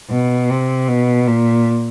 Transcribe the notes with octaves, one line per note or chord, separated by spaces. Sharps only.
B2
C3
B2
A#2